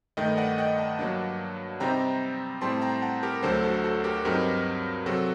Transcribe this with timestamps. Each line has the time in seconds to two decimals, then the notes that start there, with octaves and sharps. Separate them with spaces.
0.17 G2 D#3 A3 D#5 G5
0.37 D5 F#5
0.58 D#5 G5
0.78 F#5 A5
0.99 G2 F#3 A#3 D4
1.80 C3 G3 C4 D#4 G5 A#5
2.61 A2 G3 C4 A5 C6
2.82 G5 A#5
3.02 F#5 A5
3.23 G4 A#4
3.43 D2 D3 F#3 A4 C5
3.63 F#4 A4
3.84 F#4 A4
4.04 G4 A#4
4.25 G2 F#3 C4 D#4 G4 A#4
5.06 C3 F#3 C4 F#4 A4